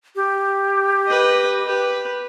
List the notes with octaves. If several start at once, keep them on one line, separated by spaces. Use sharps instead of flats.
G4
B4 D#5
G4 B4